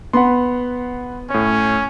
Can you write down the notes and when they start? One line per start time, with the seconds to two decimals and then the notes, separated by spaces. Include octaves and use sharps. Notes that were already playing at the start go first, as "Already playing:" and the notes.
0.13 B3 F#5 B5 C6
1.30 A2 C#4 C#5